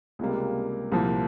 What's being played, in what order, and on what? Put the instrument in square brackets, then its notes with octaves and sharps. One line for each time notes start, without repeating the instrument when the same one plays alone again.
[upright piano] C#2 C3 G3 A#3
C2 A#2 F3